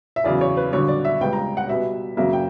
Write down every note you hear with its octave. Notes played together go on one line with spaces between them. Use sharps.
E5
E2 C#3 F#3 D5
C#5
B4
G2 D3 F#3 C#5
D5
E5
C#2 C#3 G3 B3 G5
A#5
F#5
B2 G3 B3 E5
F#2 C#3 F#3 A#3 E5
G5